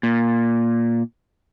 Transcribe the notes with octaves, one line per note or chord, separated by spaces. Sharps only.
A#2